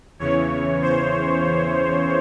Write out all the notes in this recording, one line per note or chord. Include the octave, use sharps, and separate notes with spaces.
E2 C#3 E3 C#5
C5